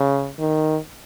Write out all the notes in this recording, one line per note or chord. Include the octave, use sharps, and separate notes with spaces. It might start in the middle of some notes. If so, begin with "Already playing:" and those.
Already playing: C#3
D#3